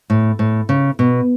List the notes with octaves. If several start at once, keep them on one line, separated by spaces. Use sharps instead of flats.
A2
A2
C#3
B2